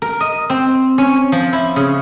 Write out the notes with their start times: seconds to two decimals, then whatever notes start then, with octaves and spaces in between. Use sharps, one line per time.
0.02 A#4
0.20 D#5
0.50 C4
0.98 C#4
1.32 F3
1.53 E4
1.76 C#3